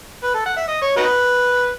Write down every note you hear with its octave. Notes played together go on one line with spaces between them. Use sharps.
B4
A4
F#5
E5
D#5
C#5
D#4 F#4 B4